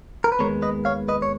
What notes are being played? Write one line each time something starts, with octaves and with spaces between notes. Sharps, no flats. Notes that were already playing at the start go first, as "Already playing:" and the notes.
A#4
B4
D#2 D#3 G#3 B3 A#4 C#5
B4 D#5
C#5 F5
B4 D#5
C#5